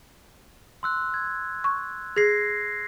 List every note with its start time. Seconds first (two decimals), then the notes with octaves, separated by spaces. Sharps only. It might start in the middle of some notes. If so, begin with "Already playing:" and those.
0.83 C6 E6 F#6
1.14 G#6
1.64 C#6
2.16 G#4 G#6 A#6 C7